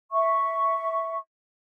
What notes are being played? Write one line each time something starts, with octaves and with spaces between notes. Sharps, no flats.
E5 C#6